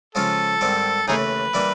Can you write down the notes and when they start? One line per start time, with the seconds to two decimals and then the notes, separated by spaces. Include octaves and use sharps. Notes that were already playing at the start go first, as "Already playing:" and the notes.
0.15 C#3 F3 G#3 C#4 F4 A4
0.61 G#2 D#3 G3 C4
1.08 D#2 C#3 E3 A3 D#4 G#4 B4
1.54 E3 G3 A#3 D4